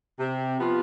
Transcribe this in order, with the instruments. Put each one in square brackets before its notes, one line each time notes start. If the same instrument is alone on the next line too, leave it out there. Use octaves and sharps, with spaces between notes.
[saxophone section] C3
F3 B3 F4